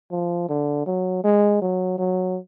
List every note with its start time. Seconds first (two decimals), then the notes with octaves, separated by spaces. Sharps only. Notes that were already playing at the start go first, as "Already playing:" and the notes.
0.11 F3
0.49 D3
0.87 F#3
1.24 G#3
1.62 F#3
1.99 F#3